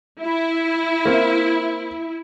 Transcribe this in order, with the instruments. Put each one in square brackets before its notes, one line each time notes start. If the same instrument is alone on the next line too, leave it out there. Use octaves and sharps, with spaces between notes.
[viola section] E4
[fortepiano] A#3 C4